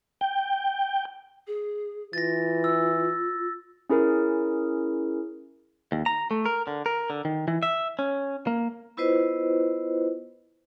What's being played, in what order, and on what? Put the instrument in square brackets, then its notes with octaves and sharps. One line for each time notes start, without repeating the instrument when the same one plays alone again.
[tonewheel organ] G5
[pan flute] G#4
[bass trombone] E3 [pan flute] F4 [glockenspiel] A6 A#6
[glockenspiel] E6
[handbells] C#4 E4 G#4 A#4
[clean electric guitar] D#2
A#5
A3
A#4
D3
A#4
D3
D#3
E3
E5
C#4
A#3
[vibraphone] B3 E4 F4 B4 C5 D#5